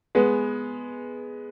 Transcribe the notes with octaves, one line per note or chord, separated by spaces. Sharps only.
G#3 B3